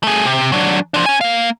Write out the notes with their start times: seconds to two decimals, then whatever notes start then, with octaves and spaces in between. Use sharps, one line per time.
0.03 A3 G#4
0.26 C3
0.52 F#3 D4
0.94 F3 D4
1.06 C#4 G#5
1.21 A#3 F5